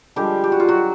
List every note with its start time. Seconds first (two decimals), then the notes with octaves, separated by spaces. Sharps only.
0.16 D3 F3 G3 G#3 G4
0.44 G4
0.52 F#4
0.60 F4
0.69 F#3 F#4